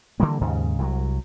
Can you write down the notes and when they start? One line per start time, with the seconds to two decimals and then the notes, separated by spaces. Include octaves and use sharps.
0.20 D3 E3 G3 A#3
0.41 D#2 G#2 C#3
0.79 C2 E3 F#3